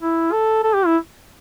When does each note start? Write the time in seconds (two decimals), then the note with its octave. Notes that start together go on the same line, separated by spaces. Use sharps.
0.01 E4
0.32 A4
0.63 A4
0.74 G4
0.86 E4